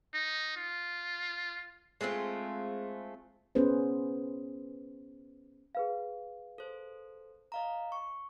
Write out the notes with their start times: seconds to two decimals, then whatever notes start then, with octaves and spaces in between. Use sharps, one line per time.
0.14 D#4
0.57 F4
2.01 G#3 A3 C4 F4
3.55 B3 C#4 G#4 B4 C5
5.75 G#4 B4 F5
6.58 A4 C5
7.52 D#5 F5 A#5
7.92 C#6